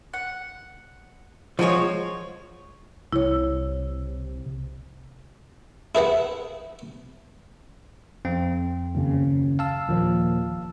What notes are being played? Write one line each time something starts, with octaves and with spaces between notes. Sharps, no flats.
F#5
F3 G#3 F#4 A4 C#5
C2 C3 E4 C#5
E4 G#4 B4 F#5
F2 C4
F#1 D#2 C#3
F5 A5 E6
D#2 A#2 F3